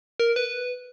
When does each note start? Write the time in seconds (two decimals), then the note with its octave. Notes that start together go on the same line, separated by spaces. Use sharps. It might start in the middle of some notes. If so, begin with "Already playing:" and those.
0.20 A#4
0.36 B4